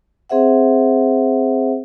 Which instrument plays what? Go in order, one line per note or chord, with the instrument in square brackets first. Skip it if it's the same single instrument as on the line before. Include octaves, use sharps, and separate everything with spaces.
[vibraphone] C4 G#4 C5 E5 F#5